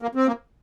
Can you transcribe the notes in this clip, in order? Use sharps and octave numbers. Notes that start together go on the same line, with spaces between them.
A#3
C4
A#3